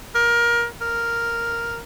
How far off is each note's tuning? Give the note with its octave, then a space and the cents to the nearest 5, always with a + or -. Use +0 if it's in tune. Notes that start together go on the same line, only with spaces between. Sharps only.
A#4 +20
A#4 +0